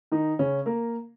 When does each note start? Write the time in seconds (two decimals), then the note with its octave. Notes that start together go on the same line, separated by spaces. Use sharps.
0.12 D#3 D#4
0.39 C#3 C#4
0.66 A#3 A#4